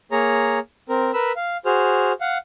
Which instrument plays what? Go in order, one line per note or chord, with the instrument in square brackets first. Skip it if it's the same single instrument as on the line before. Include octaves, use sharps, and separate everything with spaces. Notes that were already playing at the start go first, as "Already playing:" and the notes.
[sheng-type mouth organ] A#3 G#4 C#5 A#5
C4 A#4
A#4 B4 B5 E6
F5
F#4 G#4 C5 F6
F5 F#5